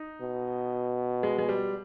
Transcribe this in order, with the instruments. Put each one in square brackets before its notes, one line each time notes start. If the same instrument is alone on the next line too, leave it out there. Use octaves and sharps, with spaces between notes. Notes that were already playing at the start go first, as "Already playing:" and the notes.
Already playing: [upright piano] D#4
[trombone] B2
[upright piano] G#3
G#3
G3